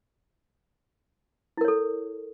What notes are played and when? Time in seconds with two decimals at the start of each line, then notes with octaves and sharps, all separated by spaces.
1.57 E4
1.61 A#4
1.65 C#5
1.68 A4